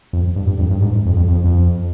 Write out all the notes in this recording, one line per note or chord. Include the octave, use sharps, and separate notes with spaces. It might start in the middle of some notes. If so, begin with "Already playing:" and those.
F2
G2
G2
F2
G2
G#2
F2
F2
F2
F2